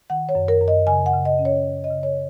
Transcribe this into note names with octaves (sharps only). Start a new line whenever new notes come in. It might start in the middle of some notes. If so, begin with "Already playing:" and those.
D#3 F#5
C#5
F#2
A#4
F#2
D#5
C#3 G#5
F#5
C#3
D#5
C#4
C#5
C#4
D#5
C#3
C#5